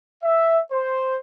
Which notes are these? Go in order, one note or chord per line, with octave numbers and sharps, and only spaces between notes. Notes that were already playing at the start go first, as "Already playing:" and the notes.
E5
C5